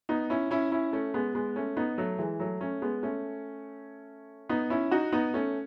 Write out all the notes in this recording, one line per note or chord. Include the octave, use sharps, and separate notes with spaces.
B3 D#4
C#4 E4
C#4 E4
C#4 E4
A3 C#4
G#3 B3
G#3 B3
A3 C#4
B3 D#4
F#3 A3
E3 G#3
F#3 A3
A3 C#4
G#3 B3
A3 C#4
B3 D#4
C#4 E4
D#4 F#4
B3 D#4
A3 C#4